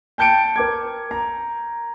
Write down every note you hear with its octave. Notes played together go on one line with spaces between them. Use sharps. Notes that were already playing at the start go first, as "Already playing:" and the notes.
G5 A5 G6 C#7 D7
A#4 D6 G#6
A#5